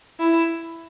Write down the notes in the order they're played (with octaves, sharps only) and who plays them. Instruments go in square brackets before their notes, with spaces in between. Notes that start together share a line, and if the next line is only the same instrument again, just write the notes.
[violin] E4